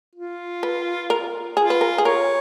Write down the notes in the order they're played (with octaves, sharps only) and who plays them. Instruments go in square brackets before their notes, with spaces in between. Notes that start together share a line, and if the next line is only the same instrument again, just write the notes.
[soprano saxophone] F4
[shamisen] B4
A#4
[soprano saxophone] F4 [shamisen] G#4
[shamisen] B4
A#4
G#4
[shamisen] A#4 [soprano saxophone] C#5